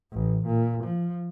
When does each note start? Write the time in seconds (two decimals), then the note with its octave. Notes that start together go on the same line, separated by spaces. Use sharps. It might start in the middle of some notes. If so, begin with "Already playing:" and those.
0.12 A1
0.46 A#2
0.84 F3